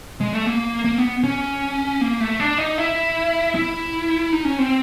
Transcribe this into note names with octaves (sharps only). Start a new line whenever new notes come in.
G#3
A3
A#3
A#3
B3
C#4
A#3
A3
D4
D#4
E4
E4
D#4
C#4
C4